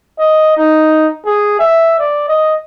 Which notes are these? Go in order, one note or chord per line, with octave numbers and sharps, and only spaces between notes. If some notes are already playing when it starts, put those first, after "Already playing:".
D#5
D#4
G#4
E5
D5
D#5